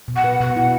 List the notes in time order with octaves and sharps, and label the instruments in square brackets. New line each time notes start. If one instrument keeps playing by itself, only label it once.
[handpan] B2
[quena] F#5
[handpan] B4
[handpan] B2 [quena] F#5
[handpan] E4